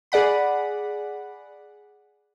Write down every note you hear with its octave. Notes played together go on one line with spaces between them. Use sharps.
G#4 D5 F#5 B5